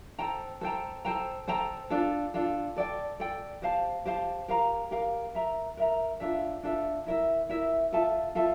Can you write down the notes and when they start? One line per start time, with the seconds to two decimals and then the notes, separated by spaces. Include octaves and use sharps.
0.19 A4 C5 G5 A#5
0.61 A4 C5 G5 A#5
1.05 A4 C5 G5 A#5
1.48 A4 C5 G5 A#5
1.90 D4 F4 A4
2.34 D4 F4 A4
2.76 A4 D5 G5
3.20 A4 D5 G5
3.62 G4 C5 F5 A5
4.06 G4 C5 F5 A5
4.48 G4 A#4 F5 A#5
4.91 G4 A#4 F5 A#5
5.34 A#4 E5 A#5
5.77 A#4 E5 A#5
6.20 D4 F4 A4 E5
6.63 D4 F4 A4 E5
7.06 E4 A#4 E5
7.49 E4 A#4 E5
7.92 F4 A4 E5 A5
8.35 F4 A4 E5 A5